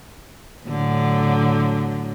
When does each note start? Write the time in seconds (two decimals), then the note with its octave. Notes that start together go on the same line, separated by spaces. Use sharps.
0.67 A2 D3 F#3